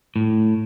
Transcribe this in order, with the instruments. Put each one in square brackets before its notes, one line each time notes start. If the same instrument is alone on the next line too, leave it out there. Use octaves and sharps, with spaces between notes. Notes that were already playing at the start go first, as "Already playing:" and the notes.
[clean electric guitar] A2